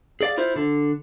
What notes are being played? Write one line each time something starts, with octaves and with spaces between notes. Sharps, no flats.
G#4 D5 F5
E4 F4 C5
D3